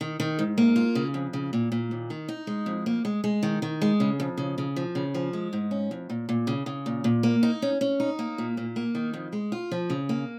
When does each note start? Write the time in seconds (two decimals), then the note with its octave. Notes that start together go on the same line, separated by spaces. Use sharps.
0.01 D#3
0.20 D#3
0.39 G#2
0.58 A#3
0.76 F4
0.95 C#3
1.14 F2
1.33 C#3
1.53 A#2
1.72 A#2
1.91 D#2
2.10 D#3
2.29 D#4
2.47 G#3
2.66 F2
2.86 A#3
3.05 G#3
3.24 G#3
3.43 D#3
3.62 D#3
3.82 G#3
4.00 C#3
4.20 F2
4.37 C#3
4.58 C#3
4.76 F3
4.95 C#3
5.14 F3
5.33 G#3
5.53 G#2
5.71 C#4
5.91 F2
6.10 A#2
6.29 A#2
6.47 C#3
6.66 C#3
6.86 A#2
7.04 A#2
7.23 A#3
7.43 D#4
7.62 C#4
7.81 C#4
8.00 D#4
8.19 A#3
8.38 A#2
8.57 A#2
8.76 A#3
8.95 D#3
9.14 F2
9.33 G#3
9.52 F4
9.72 F3
9.90 C#3
10.09 A#3